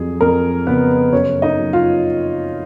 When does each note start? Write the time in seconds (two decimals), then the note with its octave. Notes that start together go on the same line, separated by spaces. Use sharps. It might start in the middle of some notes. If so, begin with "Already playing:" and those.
Already playing: F2 F#3 G#4
0.21 F2 A#4
0.67 C#3 B3 B4
1.12 F#2 C#4 C#5
1.42 D#4 D#5
1.59 F#2
1.73 F4 F5